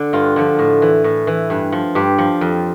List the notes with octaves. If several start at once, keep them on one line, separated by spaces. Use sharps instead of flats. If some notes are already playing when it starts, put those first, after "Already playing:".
Already playing: D3 D4
G2 F4
D3 F3
A2
E3
A2
E3
G2
F3
G2 G4
F3
F2